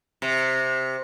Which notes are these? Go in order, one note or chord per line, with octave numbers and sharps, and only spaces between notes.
C3